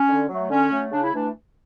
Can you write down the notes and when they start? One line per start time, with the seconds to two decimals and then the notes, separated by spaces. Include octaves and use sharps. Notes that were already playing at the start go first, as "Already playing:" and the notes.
Already playing: C#4
0.09 D3
0.29 F#3 A3
0.50 D3 C#4
0.71 F#3 A3
0.92 C#3 D4
1.03 E4
1.12 E3 A3 D4